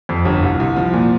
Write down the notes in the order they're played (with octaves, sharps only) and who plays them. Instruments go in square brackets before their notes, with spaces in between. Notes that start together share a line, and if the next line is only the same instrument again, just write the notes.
[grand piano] F2
G1
C2
C2
F3
A#2